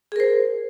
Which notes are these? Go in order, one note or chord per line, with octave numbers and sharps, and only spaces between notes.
G#4 A#4 C5